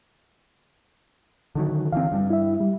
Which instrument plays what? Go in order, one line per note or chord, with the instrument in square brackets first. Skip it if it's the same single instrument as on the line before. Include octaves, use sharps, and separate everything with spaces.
[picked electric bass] D3 D#3 F#3
[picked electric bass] D3 E3 C4 [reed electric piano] F5
[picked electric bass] G2 G3
[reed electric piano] E4 E5
G3